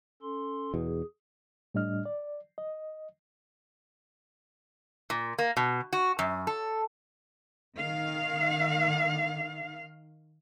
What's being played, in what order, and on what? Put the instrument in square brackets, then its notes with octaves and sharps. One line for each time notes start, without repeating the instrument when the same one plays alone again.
[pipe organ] C#4 A4 C6
[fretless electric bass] E2 B2 [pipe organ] G#4
[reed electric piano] A2 G3 D4 D#5 F6
D5
D#5
[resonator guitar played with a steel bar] A#2
A#3
B2
F#4
F#2
A4
[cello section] D#3 F5